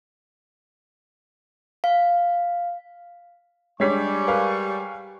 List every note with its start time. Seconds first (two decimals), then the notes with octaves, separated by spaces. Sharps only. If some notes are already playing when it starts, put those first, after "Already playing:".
1.84 F5
3.80 G3 G#3 D4 C#5 G#5 C#6 B6
4.27 A#4 B4 F5